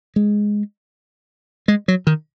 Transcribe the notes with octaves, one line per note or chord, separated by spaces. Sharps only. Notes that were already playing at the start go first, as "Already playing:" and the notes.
G#3
G#3
F#3
D#3